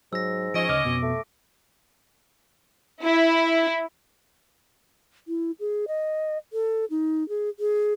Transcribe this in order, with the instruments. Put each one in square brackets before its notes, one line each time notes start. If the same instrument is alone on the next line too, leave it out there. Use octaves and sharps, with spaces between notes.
[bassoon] G#2 [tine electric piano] F#3 [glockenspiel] E6 A#6
[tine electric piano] F3 [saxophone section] C#4 C#5 D#5 [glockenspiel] A#6 D7
[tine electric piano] D2 C#3 F6 [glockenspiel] D6
[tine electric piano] F2 B2 B3
[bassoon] A3
[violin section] E4
[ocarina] E4
G#4
D#5
A4
D#4
G#4
G#4